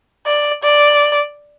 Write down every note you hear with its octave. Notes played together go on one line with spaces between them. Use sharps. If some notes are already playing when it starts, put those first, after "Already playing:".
D5
D5